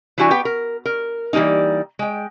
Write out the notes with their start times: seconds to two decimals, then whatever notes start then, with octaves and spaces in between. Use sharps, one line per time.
0.18 E3 G3 D4 E4 F#4 G#5
0.31 B3 G4 G5
0.45 A#4
0.85 A#4
1.33 E3 G3 G#3 A#3 D#4
1.99 G#3 G5